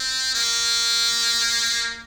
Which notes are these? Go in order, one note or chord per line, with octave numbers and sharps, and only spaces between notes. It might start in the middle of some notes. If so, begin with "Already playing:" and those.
Already playing: C4
A#3